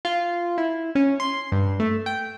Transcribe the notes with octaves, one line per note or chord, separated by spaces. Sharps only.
F4
E4
C#4
C6
G2
A3
G5